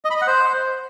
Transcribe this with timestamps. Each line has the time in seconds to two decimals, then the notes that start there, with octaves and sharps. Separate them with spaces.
0.05 D#5
0.10 B5
0.16 D#5
0.22 F#5
0.27 C5